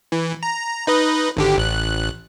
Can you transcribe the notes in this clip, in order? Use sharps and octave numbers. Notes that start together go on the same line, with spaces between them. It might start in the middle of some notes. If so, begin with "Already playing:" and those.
E3
A#5
D#4 B4 D#5
G#1 D3 G4
A1 F#6